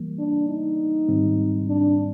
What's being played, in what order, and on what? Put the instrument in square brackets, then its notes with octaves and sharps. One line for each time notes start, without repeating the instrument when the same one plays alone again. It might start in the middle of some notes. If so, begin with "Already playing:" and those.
Already playing: [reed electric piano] E3 G3 A#3
[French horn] D4
D#4
[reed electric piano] G#2 D#3 G3 C4
[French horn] D4